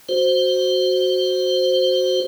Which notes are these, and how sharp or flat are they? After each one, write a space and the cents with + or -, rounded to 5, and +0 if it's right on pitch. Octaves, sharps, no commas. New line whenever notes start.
F#4 +0 C5 +0